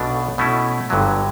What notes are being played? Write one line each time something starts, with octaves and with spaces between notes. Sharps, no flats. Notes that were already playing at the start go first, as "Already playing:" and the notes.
Already playing: B1 B2 A3 D4
B2 A3 C#4 E4
G1 G2 D3 F#3